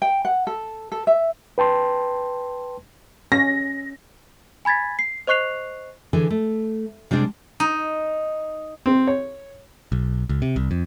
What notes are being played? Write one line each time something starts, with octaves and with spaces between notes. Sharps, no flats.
G5
F#5
A4
A4
E5
B4 G5 A5 C6
C#4 A#6
G#5 B5 G#6 A6 B6
C7
C5 D#5 C#6 F#6 C7 F7
D3 E3 G#4 G#5
A3
C3 G3 G#3 D4 G#4
D#4
C4
C#5
B1
C#2
C3
C2
F2